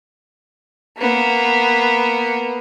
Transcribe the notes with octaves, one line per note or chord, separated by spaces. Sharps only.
A#3 B3